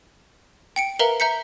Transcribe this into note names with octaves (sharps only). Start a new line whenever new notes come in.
G5 C#7 D7
A#4 B4 E5 F5 A#5 G7
E5 A#5 G6 B6 C#7